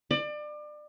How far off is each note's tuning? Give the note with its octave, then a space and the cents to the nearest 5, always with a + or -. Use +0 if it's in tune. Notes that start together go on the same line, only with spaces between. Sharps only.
D5 +30